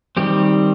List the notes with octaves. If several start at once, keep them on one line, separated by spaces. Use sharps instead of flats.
D#3 G3 C4 G4